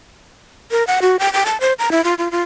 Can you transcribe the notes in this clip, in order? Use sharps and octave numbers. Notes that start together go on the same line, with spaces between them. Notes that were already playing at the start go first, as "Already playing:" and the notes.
A#4
F#5
F#4
G5
G5
A5
C5
A#5
E4
F4
F4
F4